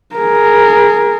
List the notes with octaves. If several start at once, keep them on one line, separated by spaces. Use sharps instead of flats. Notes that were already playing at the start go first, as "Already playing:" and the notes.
G#4 A#4